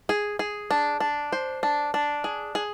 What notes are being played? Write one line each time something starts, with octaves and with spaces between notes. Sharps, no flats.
G#4
G#4
D4
D4
C5
D4
D4
G#4
G#4